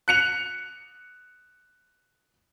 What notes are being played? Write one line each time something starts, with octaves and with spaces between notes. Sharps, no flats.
F#6 C#7 F7